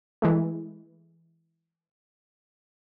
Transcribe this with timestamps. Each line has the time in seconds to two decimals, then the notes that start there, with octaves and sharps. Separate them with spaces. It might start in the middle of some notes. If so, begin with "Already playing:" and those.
0.22 E3 G#3 A3